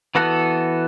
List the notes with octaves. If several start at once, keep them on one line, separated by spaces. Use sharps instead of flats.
E3 B3 F#4 A4